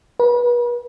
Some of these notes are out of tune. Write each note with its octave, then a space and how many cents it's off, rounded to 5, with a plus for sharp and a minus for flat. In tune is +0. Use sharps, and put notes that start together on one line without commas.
B4 -40